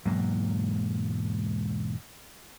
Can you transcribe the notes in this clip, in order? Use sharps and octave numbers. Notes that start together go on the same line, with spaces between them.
E1 G#2 F#3 A#3